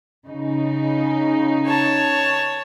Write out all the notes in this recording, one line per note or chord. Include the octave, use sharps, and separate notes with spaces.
C#3 D#4
C#5 A5